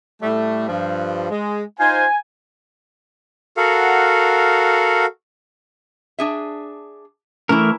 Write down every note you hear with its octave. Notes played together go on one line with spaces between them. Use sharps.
A2 G3 A3
G2 F3
G#3
D#4 F4 C5 G#5
F#4 A4 A#4 F5 F#5
D4 G#4 E5
E3 A3 C#4 E4 A#4